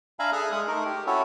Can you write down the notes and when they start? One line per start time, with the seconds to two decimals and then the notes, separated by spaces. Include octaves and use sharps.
0.19 D4 E5 F5 G#5 A#5 B5
0.33 G#4 A4 E5 D#6 F6 F#6
0.52 G#3 D#6
0.67 A3 D#4 A#4
0.85 G4
1.07 C#4 E4 F#4 A4 C#5